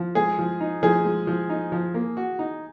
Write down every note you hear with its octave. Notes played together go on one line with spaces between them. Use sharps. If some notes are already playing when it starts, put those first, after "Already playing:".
Already playing: F3
G#3 G#4
F3
D#4
F3 G#4
G#3
F3
D#4
F3
A#3
F#4
D#4